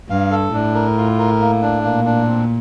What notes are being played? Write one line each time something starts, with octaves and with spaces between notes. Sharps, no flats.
G2 F5
A4
A2 D4
A#4
F4
A#4
A#3
D4
A#2 A#3
D4
C4